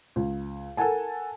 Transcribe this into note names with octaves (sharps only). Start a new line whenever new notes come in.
C#2
A4 A#4 F#5 G#5 A5